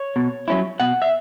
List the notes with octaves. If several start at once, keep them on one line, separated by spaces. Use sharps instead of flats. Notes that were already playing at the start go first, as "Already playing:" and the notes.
Already playing: C#5
B2
F#3 C#4 E4
B2 F#5
E5